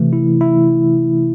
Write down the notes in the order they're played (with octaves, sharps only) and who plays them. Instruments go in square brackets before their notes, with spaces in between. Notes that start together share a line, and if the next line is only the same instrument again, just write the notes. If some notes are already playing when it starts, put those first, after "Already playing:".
Already playing: [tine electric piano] C3 E3 A3
E4
E4